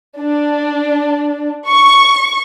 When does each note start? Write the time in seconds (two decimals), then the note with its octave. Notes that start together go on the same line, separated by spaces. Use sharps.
0.19 D4
1.69 C#6